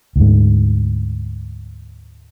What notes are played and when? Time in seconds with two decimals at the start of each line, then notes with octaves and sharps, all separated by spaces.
0.16 D2 G#2